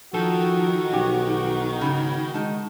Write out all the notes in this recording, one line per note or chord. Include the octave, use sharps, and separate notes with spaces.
D#3 F3 F#4 A4
B1 C#4 G4
G#2 C#3 F#4
D#3 G#3 D#4 A5